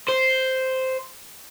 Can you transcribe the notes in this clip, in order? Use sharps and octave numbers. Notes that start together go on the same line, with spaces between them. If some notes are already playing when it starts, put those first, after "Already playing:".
C5